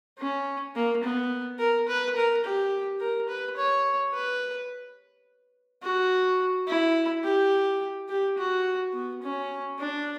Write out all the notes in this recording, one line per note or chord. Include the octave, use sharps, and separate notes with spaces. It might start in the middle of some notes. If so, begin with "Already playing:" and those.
C#4
A#3
B3
A#4
B4
A#4
G4
A#4
B4
C#5
B4
F#4
E4
G4
G4
F#4
B3
C#4
D4